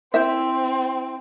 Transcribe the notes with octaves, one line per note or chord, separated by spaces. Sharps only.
C4 E4 C5 E5